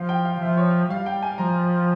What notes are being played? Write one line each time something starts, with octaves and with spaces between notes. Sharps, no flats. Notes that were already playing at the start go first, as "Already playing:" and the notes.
Already playing: F3 F5
G5
F5
F3 E5
C#5
G3 F5
G5
G#5
F3 A#5